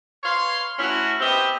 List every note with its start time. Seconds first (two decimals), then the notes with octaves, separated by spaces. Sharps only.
0.24 B4 C#5 F5 C6
0.79 A3 C#4 E4 F#4
1.20 B3 C4 G4 C5 D#5 E5